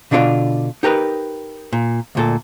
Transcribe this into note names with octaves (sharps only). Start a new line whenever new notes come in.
B2 D3 D4 F4 C5 D5
D#4 G4 A#4 B4
A#2
D2 A#2 A4